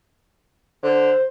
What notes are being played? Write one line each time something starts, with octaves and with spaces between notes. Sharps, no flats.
D3 C5